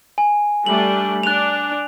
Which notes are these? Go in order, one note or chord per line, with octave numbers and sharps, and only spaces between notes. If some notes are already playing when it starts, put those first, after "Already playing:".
G#5
G3 A3 D4 F#7
D4 F#6 F7